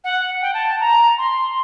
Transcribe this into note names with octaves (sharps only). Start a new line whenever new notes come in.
F#5
G5
A5
A5
A#5
C6